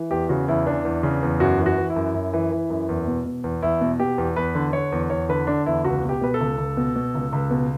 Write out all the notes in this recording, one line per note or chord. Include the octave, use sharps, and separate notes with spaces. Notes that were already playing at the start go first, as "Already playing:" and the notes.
Already playing: E3
E2 G4
C#3 F#4
E2 E4
E3 D4
E2
C#3
E2
F#2 F#4
E3
F#4
E3
E4
F#2
F#2
E3
E3
F#2
E2
B2
B2
E2
E2 E4
B2
B2 G4
E2
E2 B4
D3
D3 C#5
E2
E2 C#5
D3 B4
D3 D4
E2 E4
C#2 F#4
B2
G4
B2 B4
A4
C#2
C#2
B2
B2
C#2
C#2
B2